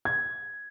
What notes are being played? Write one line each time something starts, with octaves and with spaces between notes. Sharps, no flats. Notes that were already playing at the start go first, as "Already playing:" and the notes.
G#6